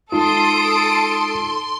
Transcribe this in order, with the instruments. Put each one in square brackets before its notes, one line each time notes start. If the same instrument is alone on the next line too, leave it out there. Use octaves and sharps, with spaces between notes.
[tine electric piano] G#3 D#4 F4 [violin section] A4 D7 [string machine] C6 [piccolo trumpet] D#6